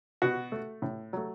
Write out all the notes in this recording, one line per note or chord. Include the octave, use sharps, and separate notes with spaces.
B2 F#4
A3
A2
F#3 A3